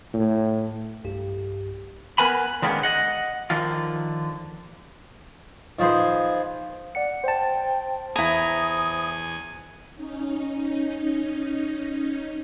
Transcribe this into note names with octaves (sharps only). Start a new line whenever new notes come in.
A2
B1 G2 G4
B3 A#4 B4 G#5 B5
D3 D#3 G#3 A#3 B3 C#4
D#5 F#5
D3 D#3 F3 F4
D#3 F3 G#4 B4 C5
D5 F#5 C#7
C5 G5 A5
E2 E4 G#5 A#5 D#6
C#4 D#4